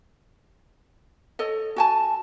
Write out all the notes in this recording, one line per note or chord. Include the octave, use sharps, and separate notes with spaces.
A4 C#5 D#5
F#4 G#5 A5